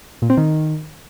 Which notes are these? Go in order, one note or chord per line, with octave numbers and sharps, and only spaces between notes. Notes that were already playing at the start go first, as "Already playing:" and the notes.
A#2
C4
D#3